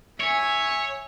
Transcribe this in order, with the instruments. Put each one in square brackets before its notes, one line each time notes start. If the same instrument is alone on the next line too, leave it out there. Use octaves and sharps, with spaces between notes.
[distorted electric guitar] C#5 [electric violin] E5 G#5